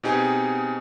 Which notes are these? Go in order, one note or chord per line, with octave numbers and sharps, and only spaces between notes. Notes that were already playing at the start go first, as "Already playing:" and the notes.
B2 B3 C4 D#4 G4 G#4